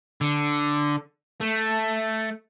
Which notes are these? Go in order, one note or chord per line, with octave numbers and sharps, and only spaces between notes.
D3
A3